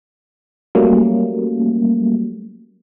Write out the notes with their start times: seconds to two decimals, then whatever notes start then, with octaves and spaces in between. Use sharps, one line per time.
0.75 F#3 G3 A3 A#3 C#4